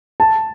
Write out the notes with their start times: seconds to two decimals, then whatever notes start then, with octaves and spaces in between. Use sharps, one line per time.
0.20 A5